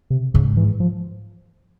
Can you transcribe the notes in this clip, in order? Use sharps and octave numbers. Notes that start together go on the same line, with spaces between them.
C3
G#2 C#3
E3
F3